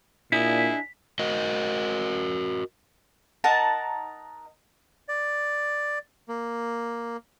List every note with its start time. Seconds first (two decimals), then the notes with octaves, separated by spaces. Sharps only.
0.32 A#2 D4 E4 G#4 D#5 B6
1.19 F#4 A#4 D#5
3.44 D#4 A#4 F#5 A5
5.09 D5
6.28 A#3